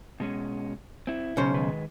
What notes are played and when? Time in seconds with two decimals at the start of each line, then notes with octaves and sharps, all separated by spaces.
0.20 B2 G#3 C#4
1.07 C4 E4
1.37 B1 C#3 C#4 C5
1.54 D#3 G#3 B4